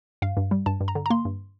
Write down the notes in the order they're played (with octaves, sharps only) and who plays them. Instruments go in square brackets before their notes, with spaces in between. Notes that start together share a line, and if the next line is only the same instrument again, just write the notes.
[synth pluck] G2 F5
G2
G3
G2 A5
G2
A#5
D3
A#5
A#3 C6
G2